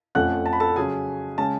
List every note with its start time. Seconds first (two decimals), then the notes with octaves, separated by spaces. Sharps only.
0.15 F2 F3 A3 C#4 F#5 F#6
0.46 A5
0.53 B5
0.60 A4 A5
0.76 C#3 F#3 C#4 G#4 G#5
1.38 C#3 G#3 C#4 A5